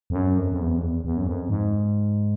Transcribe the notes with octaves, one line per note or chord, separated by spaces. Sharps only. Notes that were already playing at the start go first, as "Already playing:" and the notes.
F2
F#2
F2
F2
E2
F2
E2
E2
F#2
F2
G#2